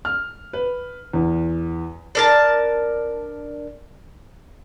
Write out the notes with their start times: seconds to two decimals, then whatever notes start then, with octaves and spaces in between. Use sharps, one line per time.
0.05 F6
0.53 B4
1.13 E2
2.15 D4 A#4 A5